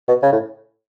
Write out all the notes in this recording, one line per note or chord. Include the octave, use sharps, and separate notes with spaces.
B2
C#3
A2